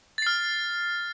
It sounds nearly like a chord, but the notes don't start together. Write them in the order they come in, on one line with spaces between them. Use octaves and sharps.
A6 C7 F6